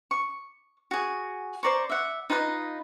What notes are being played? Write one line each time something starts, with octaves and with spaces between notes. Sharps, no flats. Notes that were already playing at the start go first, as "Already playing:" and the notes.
C#6
F#4 G#4
C5 D5 A#5 C#6
E5 F#5
D#4 F4 B4 D#5